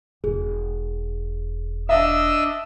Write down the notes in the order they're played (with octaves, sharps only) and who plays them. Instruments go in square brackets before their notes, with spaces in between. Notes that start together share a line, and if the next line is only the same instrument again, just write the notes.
[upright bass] E1 [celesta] G#4
[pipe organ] D4 D#5 E6 [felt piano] E5